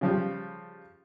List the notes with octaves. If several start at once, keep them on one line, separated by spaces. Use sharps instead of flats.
C#3 F3 G3